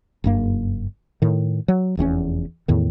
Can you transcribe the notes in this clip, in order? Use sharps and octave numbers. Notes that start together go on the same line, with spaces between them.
F#1 G2 A#3
A2 D#3
F#3
F1 E2 C4 C#4
E2 A2 D#3